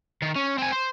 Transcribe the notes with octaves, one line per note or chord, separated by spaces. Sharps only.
D#3
C#4
C4 G#5
C5